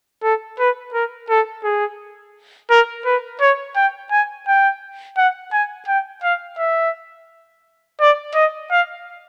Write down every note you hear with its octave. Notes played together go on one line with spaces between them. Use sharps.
A4
B4
A#4
A4
G#4
A#4
B4
C#5
G5
G#5
G5
F#5
G#5
G5
F5
E5
D5
D#5
F5